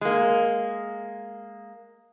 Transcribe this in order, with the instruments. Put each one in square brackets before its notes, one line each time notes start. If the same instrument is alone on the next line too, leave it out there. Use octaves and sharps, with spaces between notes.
[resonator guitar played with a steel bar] G#3 A#3